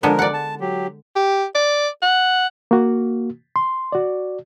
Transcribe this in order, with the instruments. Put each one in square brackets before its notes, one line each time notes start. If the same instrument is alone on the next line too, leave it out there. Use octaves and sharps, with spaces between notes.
[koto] D3 G#3 B3 [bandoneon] F3 A#4
[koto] D5 F#5
[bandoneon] A5
F#3 G4
[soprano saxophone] G4
D5
F#5
[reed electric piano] A#3 F#4
C6
F#4 D5